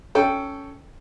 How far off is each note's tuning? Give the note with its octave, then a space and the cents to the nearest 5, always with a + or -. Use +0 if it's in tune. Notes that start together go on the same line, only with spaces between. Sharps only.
C#4 +10 A4 +0 G5 +0